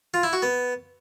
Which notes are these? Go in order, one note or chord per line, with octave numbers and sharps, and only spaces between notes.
F4
E4
F#4
B3